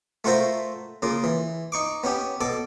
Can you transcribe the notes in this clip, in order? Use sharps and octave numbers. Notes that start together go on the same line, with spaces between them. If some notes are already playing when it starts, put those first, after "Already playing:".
A3 F4 F#4 A#4 C5 E5
C#3 A#3 F4
E3
D#4 C#6 D6
B3 C#4 G4
B2 A4 D6